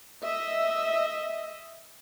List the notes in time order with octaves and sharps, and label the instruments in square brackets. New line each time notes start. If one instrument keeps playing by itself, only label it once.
[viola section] D#5 E5